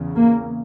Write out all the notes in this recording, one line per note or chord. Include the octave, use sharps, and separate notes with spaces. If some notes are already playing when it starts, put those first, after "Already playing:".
Already playing: E2 C#3
A#3